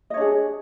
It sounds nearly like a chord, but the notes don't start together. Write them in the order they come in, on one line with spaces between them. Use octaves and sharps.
D#5 C#5 D4 G#4